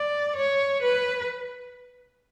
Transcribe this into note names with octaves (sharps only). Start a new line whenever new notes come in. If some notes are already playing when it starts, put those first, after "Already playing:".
Already playing: D5
C#5
B4